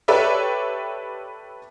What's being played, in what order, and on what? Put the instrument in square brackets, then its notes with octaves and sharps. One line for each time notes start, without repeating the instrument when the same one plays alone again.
[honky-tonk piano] G4 A4 B4 C#5 D5 E5